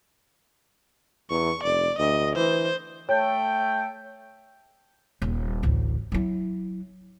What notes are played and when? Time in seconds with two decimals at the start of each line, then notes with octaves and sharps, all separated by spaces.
1.30 E2 C#6
1.63 F1 D5
1.98 D2 D#5
2.36 E3 C5
3.09 A3 C#5 G5
5.22 D#1
5.63 A1 D2
6.12 F#3 E4